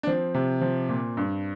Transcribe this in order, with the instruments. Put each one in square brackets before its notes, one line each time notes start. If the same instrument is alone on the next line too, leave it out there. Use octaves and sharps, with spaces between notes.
[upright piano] D4
F3 C4
C3
F3
A#2
G2